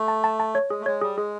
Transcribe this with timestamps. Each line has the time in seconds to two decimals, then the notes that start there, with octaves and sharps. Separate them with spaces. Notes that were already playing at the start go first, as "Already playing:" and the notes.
Already playing: A3
0.08 A5
0.24 A5
0.40 A5
0.55 C#5
0.70 G#3 G#4
0.81 A3
0.86 G#3 C#5
1.02 G3 G#4
1.17 G#3 G#4